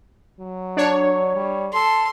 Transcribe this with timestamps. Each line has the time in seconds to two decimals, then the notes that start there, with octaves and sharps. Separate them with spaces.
0.40 F#3
0.77 D4 C#5
1.36 G3
1.74 A4 C6